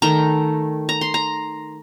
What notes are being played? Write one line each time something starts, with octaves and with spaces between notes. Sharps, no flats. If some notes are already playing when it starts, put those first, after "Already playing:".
D#3 A3 A#5
A#5
C6
A#5